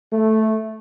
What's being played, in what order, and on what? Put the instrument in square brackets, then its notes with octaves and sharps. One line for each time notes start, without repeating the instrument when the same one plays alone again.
[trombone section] A3